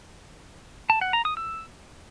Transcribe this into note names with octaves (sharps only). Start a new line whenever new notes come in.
A5
F#5
A#5
D#6
E6